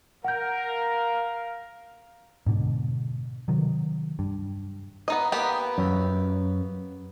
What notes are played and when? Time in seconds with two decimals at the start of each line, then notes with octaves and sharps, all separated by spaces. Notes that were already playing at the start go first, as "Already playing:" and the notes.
0.24 A#4 F5 F#5 G6
2.46 G#2 B2 D3
3.48 C3 D#3 F#3
4.19 G2
5.08 B3 D#4 D#5
5.32 A#3 B3 G4
5.78 F#2